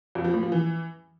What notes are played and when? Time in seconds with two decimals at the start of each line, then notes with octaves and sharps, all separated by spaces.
0.15 F2
0.25 F3
0.34 A2
0.43 F3
0.52 E3